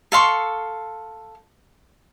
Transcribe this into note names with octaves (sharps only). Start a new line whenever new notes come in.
A4 F5 C6 C#6